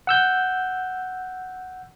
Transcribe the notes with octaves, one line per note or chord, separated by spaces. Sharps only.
F#5 E6 G6